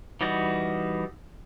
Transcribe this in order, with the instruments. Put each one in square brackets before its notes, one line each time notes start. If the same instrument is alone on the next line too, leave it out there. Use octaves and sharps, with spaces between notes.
[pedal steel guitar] E3 G3 D#4 F#4 D5